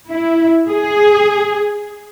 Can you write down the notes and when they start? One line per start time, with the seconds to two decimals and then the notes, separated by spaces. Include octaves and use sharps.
0.11 E4
0.71 G#4